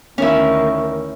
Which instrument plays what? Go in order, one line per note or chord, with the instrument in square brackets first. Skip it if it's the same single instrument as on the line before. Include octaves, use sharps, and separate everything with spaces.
[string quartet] D2 D#3 [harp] C#4 E4